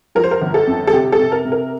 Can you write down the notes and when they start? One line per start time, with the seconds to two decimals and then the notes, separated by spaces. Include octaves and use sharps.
0.15 F3 A#4
0.24 C5
0.31 A#4
0.42 G1
0.54 A4
0.67 F2
0.87 A4
0.93 C3 G4
1.12 A4
1.19 C3
1.32 A#4
1.45 C3
1.52 A#4